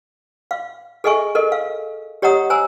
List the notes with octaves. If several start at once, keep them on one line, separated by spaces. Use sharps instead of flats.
F5
G#4 A4 D#5 E5 G#5 C#6
A4 A#4 D#5
F5
G4 C#5 D#5 F#5 A#5 D#6
C5 G#5 A#5 E6